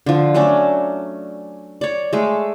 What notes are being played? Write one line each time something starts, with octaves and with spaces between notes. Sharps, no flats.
D3 F3
F#3 A3 C#4 D4
C#5 D5
G#3 A3